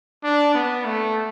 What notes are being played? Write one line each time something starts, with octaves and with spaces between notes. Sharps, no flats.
D4
B3
A3